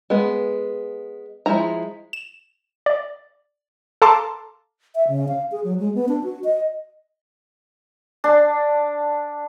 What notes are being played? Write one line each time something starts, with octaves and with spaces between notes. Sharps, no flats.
G#3 B3
F3 G#3 E4 A#5
E7
D5
A4 F5 A5 A#5 C6 D6
E5
C#3
F5
G#4
F#3
G#3
B3
D4
F#4
D#5
D4